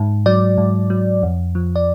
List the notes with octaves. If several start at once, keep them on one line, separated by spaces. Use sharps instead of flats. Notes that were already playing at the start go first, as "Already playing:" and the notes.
Already playing: G#2
F#3 D5
G#2
F#3
F2
F3
D5